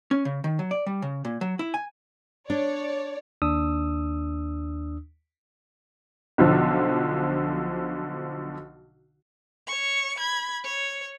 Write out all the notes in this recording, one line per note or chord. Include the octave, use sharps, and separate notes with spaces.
C#4
C#3
D#3
F#3
D5
G3
C#3
A#2
F#3
E4
G#5
D4 C#5 D5
D#2 D4 D#6 E6
B1 D3 F3
C#5 C#6
B5 G#6
C#5